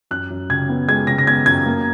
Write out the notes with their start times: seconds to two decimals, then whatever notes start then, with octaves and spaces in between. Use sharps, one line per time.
0.11 F#2 F#6
0.30 F#2
0.49 C#3 G#6
0.69 B3
0.88 G#3 G#6
1.07 C#3 A#6
1.18 A#6
1.27 B3 G#6
1.46 F#2 G#6
1.66 A#3